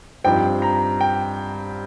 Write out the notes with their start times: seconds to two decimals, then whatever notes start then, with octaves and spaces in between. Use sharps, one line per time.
0.24 G2 F3 C4 D#4 G5
0.62 A#5
1.01 G5